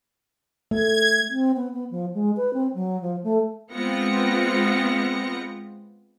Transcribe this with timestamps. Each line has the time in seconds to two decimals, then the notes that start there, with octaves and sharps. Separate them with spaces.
0.71 A3 G#6
1.29 C4
1.56 B3
1.73 B3
1.91 F3
2.14 G#3
2.37 B4
2.54 C4
2.74 F#3
3.01 F3
3.24 A3
3.73 G#3 B3 C4 F4 A#6 C#7